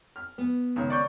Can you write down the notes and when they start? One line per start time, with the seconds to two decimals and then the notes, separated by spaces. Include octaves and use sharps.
0.16 F6
0.38 B3
0.76 C#2 D#3
0.90 D5 C#6 G6